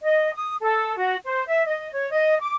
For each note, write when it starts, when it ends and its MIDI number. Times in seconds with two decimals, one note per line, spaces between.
0.01 0.33 75
0.34 0.55 87
0.61 0.94 69
0.97 1.15 66
1.25 1.44 72
1.47 1.65 76
1.66 1.90 75
1.92 2.09 73
2.12 2.35 75
2.41 2.54 86